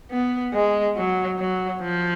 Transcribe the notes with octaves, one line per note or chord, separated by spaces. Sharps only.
B3
G#3
F#3
F#3
F3